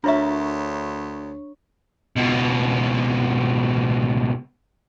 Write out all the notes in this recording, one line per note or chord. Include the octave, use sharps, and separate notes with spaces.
D2 D4 A#4 C#5 E5 C#6
C#2 B2